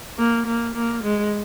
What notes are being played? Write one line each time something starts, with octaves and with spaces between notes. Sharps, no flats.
A#3
A#3
A#3
G#3